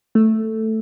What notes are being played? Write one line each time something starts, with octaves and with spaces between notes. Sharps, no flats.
A3